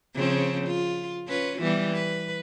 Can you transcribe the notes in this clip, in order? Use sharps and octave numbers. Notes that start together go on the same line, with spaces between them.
C#3 F3 C4
F4
C#4 F4 B4
E3 G3 B3
B4